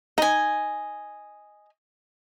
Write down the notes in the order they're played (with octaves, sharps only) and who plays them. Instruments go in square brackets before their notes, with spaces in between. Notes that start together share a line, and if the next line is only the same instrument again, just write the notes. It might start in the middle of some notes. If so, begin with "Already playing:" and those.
[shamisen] D#4 A#5 [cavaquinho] D#5 G#5